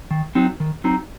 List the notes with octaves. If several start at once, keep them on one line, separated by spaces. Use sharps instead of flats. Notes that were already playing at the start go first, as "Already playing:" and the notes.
D#3
F#3 C4 D#4
D#3
F#3 C4 D#4